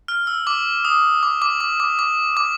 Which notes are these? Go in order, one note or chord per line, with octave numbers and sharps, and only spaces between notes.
F6
E6
D6
D#6
D6
D6
D6
D6
D6
D6